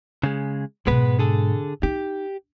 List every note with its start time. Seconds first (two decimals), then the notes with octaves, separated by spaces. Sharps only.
0.23 C#3 G#3
0.87 G#2 B2 G#3 B3 B4
1.19 D3 G#4 A4
1.83 D#4 G4